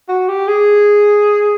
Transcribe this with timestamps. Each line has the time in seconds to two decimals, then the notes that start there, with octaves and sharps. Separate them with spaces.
0.09 F#4
0.29 G4
0.48 G#4